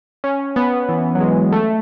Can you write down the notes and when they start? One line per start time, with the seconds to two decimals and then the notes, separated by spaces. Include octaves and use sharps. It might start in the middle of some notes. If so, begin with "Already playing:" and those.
0.24 C#4
0.56 B3
0.89 E3
1.15 F#3
1.20 G#3
1.52 A3